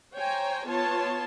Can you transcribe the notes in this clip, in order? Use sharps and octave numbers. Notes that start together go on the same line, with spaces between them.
C5 C#5 G5 G#5 A#5
B3 F4 C#5 A5 C6